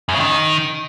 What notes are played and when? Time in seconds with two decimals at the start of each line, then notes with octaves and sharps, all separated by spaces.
0.09 F#2
0.14 C#3
0.20 D#3